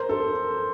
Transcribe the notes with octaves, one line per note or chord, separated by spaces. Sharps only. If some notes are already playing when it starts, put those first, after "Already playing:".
Already playing: A#4 C5
A4